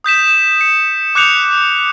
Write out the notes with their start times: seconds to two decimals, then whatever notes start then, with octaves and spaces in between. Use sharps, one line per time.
0.04 D#6 G6 B6 E7
0.61 C#7
1.15 D6 F#6 G6 C#7 F7